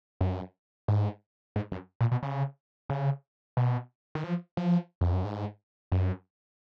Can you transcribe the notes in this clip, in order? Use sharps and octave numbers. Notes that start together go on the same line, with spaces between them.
F#2
G#2
G#2
F#2
A#2
B2
C#3
C#3
B2
D#3
F3
F3
F2
F#2
G#2
F#2